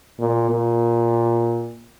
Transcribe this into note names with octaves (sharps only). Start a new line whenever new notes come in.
A#2
A#2